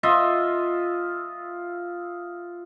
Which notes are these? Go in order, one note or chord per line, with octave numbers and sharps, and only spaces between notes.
F4 D#5 E5